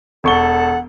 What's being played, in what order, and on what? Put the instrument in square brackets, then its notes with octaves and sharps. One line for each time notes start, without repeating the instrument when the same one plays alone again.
[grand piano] E1 C#6 G7 [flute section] A4 F#5